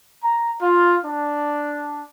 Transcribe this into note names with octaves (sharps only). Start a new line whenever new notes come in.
A#5
F4
D4